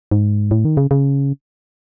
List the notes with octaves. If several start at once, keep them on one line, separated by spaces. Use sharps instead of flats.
G#2
A2
D#3
C#3
C#3